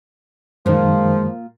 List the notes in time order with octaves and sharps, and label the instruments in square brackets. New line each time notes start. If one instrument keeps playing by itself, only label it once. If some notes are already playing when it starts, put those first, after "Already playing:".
[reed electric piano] F#2 D#3 [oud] A#2 A#3 [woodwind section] F3 [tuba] G#3